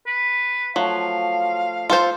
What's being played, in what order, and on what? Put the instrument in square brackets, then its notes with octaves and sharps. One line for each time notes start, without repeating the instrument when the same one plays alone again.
[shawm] B4
[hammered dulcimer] F3 A3 [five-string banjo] F#3 [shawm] F5
[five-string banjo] F4 A4 C5